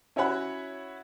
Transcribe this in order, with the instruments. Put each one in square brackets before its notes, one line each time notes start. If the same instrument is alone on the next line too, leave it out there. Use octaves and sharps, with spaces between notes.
[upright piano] C#4 E4 F#4 C#5 F#5 B5